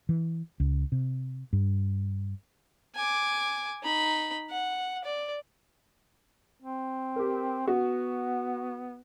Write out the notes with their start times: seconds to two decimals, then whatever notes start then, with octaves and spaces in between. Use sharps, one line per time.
0.09 E3
0.60 C#2
0.92 C3
1.53 G2
2.96 G#5 D6
3.83 D#4 B5
4.50 F#5
5.05 D5
6.60 C4
7.16 G4 A#4
7.67 B3 F#4